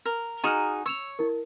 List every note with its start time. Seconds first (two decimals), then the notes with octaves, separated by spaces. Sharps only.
0.05 A#4
0.44 D#4 F#4 G#4 A#5 D#6 F6
0.86 C#5 E6 E7 F7
1.19 E4 A#4